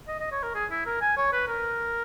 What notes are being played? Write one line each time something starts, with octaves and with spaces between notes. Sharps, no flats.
D#5
D#5
C#5
A#4
G#4
E4
A#4
G#5
C#5
B4
A#4